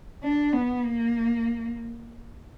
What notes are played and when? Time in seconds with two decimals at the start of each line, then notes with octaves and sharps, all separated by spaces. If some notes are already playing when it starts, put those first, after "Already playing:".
0.23 D4
0.53 B3
0.85 A#3